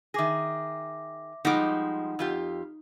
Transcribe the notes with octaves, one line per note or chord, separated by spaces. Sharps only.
D#3 G#4 E5 D6 A#6
F3 G3 G#3 D#4 F#5 D6
F2 F4 G4